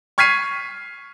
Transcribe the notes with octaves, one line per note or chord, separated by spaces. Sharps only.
C#6 F6 G#6 B6 C7 D#7